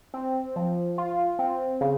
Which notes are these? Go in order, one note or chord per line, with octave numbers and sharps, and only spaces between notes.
C4
F3
F4
C4
C#3